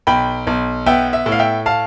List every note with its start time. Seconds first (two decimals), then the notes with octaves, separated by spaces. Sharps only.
0.07 B1 G5 B5
0.47 B1
0.86 B3 E5 G5
1.13 E5
1.26 A2
1.32 F5
1.39 E5 G5
1.66 F5 A5